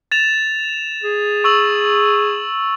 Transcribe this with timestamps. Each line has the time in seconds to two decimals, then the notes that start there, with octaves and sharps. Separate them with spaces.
0.12 A6 E7 F7
1.03 G#4
1.44 C#6 E6 F#7